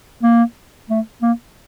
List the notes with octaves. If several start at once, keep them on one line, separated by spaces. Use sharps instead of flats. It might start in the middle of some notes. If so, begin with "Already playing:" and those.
A#3
A3
A#3